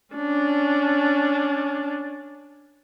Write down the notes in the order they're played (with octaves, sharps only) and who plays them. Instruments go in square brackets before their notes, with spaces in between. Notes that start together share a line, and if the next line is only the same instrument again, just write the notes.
[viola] C#4 D4